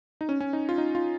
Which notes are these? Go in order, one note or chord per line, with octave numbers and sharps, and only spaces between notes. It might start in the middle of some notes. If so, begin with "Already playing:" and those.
D#4
C#4
C#4
D#4
F4
D#4
F4